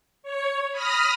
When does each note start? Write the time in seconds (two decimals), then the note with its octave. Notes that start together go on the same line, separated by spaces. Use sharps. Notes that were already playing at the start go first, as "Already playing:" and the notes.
0.23 C#5
0.71 B5 D#6 F6 A#6